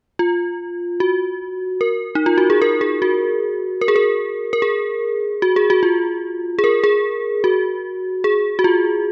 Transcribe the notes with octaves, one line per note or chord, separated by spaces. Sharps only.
F4
F#4
A#4
D#4
F4
F#4
G#4
A#4
G#4
F#4
A#4
G#4
A#4
A#4
G#4
F#4
G#4
F#4
F4
G#4
A#4
G#4
F#4
G#4
F#4
F4